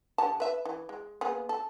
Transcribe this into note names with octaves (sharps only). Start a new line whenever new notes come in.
D3 G4 A5
B4 E5
E3
G#3
A#3 B3 G#4
A4